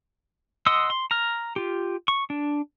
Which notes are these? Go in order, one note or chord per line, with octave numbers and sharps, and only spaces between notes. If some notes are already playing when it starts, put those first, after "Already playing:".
D#5 F#5 C6 D#6 E6
C6
A#5 F6
F4 G4
C#6
D4